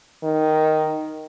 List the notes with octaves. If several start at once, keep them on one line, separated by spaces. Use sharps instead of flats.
D#3